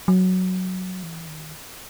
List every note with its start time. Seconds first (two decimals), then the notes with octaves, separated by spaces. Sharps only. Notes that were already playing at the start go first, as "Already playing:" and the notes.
0.08 F#3
1.03 E3
1.27 D#3